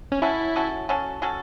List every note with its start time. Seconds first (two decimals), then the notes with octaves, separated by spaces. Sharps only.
0.12 C#4
0.22 F#3 C#4 E4 F#4 A4
0.56 F#3 C#4 F#4 A4
0.89 F#3 C#4 F#4 A4
1.22 F#3 C#4 F#4 A4